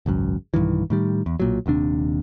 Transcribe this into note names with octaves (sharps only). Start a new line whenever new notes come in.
G#1 C#2 F#2
B1 G2 D#3 E3
A2 D#3 G3
E2
B1 A#2 F#3
D#1 D#2 C3 D4